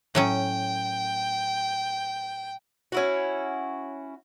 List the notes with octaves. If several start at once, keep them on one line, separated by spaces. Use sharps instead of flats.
A2 F#3 C#4 G5
C#4 E4 F#4